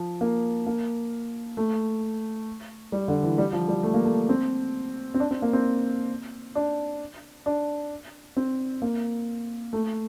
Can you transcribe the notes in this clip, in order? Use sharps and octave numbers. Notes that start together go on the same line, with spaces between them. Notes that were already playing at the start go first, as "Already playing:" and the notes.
Already playing: F3
A#3
A#3
A3
G3
D3
E3
G3
F3
G3
A3
A#3
A3
C4
C4
D4
C4
A#3
C4
D4
D4
C4
A#3
A3